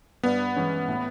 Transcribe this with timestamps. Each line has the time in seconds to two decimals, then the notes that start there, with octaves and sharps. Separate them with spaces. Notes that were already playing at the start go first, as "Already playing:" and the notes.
0.23 G2 B3
0.56 E3 G#3 C#4
0.88 A2